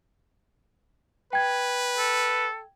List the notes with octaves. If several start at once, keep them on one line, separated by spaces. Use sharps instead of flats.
B4 G5 G#6
A4